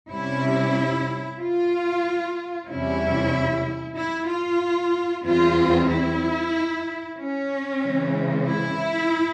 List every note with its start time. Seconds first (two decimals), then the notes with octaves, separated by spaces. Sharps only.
0.10 C3 G3 C#4 E4
1.39 F4
2.68 E2 C3 G3 C#4 E4
3.96 E4
4.28 F4
5.25 E2 E3 G3 C4 F4
5.89 E4
7.18 C#4
7.82 C#3 E3 G#3 C4
8.46 E4